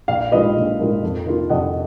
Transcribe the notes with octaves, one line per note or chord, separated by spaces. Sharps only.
A#1 D5 F5
G#2 F3 A#3 F4 B4 D#5
A#1
G#2 F3 A#3 F4
F2
D#3 A#3 F4
F2 D#5 F#5